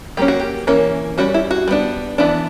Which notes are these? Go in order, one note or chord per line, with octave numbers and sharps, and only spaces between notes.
F#3 A#3 C#4 G4
F#4
G4
E3 A#3 C#4
G3 C#4 F#4
E4
F#4
G3 B3 D4
E3 B3 D4